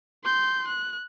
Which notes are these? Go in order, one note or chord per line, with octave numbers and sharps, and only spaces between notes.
C6 G6
F#6